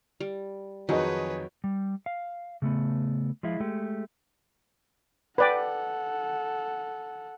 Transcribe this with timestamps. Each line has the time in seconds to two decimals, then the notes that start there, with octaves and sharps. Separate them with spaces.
0.20 G3
0.89 F2 D#3 F#3 D#4 G#4 B4 C#5 D#5
1.64 G3
2.06 F5
2.62 C#3 A3 B3
3.43 F3 G#3 E4 F4
3.60 G#3 A3 G4
5.38 A4 B4 D5 F#5 G5